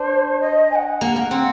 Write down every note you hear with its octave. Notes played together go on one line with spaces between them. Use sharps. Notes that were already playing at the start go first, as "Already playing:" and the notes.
Already playing: D4 C5
D#5
G#5
F#5
A#3 F#5
A#3
C4